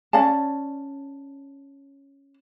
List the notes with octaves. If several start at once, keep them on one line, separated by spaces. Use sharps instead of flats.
C#4 D5 F5 A5